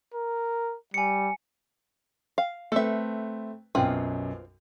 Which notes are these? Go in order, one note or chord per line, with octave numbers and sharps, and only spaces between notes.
A#4
G3 G#5 C#7
F5
A3 C4 A4 B4 E5
B1 F#2 C4 F4 B4